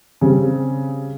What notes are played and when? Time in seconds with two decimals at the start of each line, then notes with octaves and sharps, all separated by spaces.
0.21 C#3 G3 C4